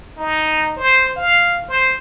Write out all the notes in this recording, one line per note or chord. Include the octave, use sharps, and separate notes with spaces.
D#4
C5
F5
C5